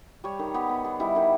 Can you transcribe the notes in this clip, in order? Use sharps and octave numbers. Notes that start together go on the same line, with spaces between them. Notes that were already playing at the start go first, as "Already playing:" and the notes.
G3 C#5
D#3
B3 G4
B3
B3 G#4
G3 E4
D#3 E4